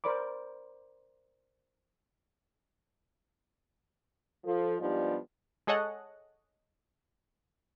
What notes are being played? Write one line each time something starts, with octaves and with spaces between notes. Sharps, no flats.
A#4 C5 D5 B5 D6
F3 A4
G#2 F3 G3 B3 D4 G4
G#3 G#4 A4 C#5 D#5 F#5